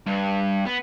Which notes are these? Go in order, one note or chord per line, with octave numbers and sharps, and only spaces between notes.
G2
B3